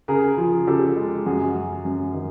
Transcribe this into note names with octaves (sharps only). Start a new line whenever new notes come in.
C#3 G#4 A#4
F3
C#3 G4 A4
G#3
F#2 F#4 G#4
F#3
F#2
D#3